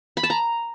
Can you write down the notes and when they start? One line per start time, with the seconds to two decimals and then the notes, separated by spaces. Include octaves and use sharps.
0.17 B5
0.23 A5
0.30 A#5